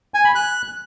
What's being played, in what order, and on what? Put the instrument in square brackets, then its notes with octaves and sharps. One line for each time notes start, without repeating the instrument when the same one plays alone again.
[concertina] G#5
B5
F#6